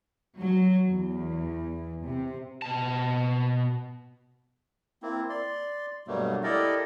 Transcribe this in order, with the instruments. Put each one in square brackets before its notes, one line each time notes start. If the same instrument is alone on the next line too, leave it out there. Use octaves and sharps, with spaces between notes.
[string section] F#3
E2
C3
[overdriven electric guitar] B2 A5
[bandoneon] A#3 C4 E4
D5 C6
G2 B2 F#3 G3 A3 A#3
E4 G4 A4 A#4 D5 D#5